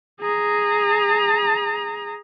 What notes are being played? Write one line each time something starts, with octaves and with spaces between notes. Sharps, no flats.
G#4 A#5